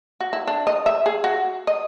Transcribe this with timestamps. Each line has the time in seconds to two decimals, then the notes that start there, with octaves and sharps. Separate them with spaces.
0.20 F#4
0.33 E4
0.47 D4
0.67 D#5
0.86 E5
1.06 G#4
1.24 F#4
1.67 D#5